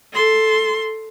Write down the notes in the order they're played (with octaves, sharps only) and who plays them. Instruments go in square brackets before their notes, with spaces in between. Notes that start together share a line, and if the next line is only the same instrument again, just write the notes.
[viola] A4 C6